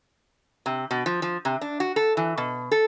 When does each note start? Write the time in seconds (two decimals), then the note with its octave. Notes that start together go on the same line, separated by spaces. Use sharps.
0.66 C3
0.91 B2
1.06 F3
1.22 F3
1.45 C3
1.61 D4
1.80 F#4
1.96 A4
2.17 E3
2.38 B2
2.71 A4